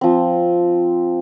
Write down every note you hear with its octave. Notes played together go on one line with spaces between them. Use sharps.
F3 C4